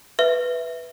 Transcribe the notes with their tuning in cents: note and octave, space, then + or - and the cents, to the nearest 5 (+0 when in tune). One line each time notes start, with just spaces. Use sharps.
B4 +0 E5 +0